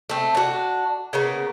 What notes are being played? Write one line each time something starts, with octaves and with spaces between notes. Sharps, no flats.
A3 C4
D4 F#4
C#3 A#3 B3